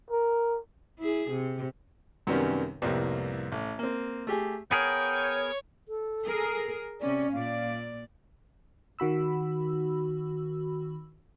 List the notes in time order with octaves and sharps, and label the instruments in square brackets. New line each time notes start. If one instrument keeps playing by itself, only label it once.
[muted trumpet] A#4
[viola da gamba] E4 G#4
C3
[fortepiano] F#2 C3 D#3 G3 B3 C#4
C2 F2 A2 G3 A#3 B3
A1
A#3 C4
A3 G4 G#4
[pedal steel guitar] B3 G#4 A#4 [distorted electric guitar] C#5 [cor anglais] G5
[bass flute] A4
[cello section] G#4 A#4
[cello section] C3 C#4 [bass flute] D5
[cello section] A#2 D5 [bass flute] F5
[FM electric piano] D#3 F#4 B5 E6